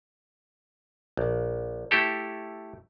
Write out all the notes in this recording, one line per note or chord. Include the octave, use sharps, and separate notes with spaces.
A#1
A3 E4 G4 A4